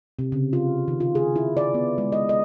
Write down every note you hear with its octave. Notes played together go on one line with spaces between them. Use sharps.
C3
C#3
F4
D#3
F4
G#4
E4
D5
B3
G#3
D#5
D#5